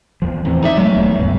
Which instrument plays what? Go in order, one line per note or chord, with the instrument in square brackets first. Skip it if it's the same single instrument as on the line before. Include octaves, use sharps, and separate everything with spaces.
[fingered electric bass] E2 F3
[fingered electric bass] A2 E3 C4 [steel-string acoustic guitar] C3
[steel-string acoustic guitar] D#4 D5 E5
[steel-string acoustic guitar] F#3 F5 [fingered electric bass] G#3 A3
[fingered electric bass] D1 E2 A3
C#2 G2 B2